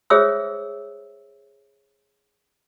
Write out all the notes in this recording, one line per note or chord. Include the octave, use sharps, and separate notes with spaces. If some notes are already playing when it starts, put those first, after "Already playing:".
G#4 C5 C#5 E5 D#6 E6